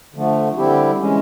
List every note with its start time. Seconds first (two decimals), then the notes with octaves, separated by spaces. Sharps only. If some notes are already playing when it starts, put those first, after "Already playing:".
0.15 D3 F3 A3
0.57 D3 G3 C4 E4 G4
1.00 E3 G#3 C#4